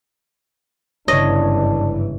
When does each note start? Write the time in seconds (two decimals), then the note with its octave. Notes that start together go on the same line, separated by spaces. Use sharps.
1.08 G1 G#2 C#3 E3 D4 C#5 D#5